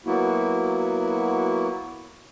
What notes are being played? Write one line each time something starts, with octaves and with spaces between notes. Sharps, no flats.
F#3 A#3 B3 E4 F#4